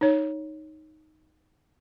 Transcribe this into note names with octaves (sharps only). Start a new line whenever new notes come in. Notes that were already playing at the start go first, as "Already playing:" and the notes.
D#4 C#5